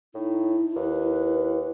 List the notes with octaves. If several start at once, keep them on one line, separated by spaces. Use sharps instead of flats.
A2 D#4 E4
D#2 B4